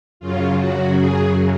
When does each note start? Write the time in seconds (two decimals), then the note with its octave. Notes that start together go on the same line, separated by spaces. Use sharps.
0.20 F#2 C#3 F#3 F4
0.57 F#4
0.94 G#4